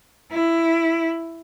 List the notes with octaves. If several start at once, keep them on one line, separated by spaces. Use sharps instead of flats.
E4